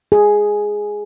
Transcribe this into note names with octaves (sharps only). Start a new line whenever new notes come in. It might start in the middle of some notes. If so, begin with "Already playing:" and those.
G#4